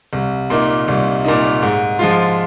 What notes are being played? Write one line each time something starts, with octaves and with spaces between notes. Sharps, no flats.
C2
A#2 A#3 D#4
C2
A#2 A#3 D#4
G#2
F3 G#3 F4